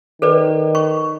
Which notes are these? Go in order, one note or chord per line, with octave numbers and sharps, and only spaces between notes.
D#3 A4 B4 D5
C#6